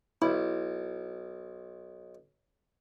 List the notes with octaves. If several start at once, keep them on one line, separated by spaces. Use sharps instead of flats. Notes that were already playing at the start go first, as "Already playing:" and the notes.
B1 E4